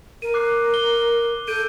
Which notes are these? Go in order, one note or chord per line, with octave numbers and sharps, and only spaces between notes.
A#4 D#7
D6 F#6 C7
G7
A4 G6 D7 D#7